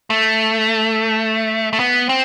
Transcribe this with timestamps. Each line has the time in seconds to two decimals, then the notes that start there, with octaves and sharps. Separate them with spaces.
0.10 A3
1.73 A3
1.80 B3
2.09 C4